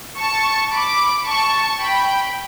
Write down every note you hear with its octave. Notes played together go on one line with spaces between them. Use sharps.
A5 C#6
B5 D6
A5 C#6
G5 B5